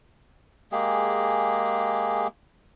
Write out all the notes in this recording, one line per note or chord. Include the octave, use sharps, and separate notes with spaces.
G#3 A#3 G4 G#4